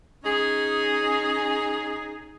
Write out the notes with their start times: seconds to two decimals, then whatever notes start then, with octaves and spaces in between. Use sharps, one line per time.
0.24 C#4 D#4 G#4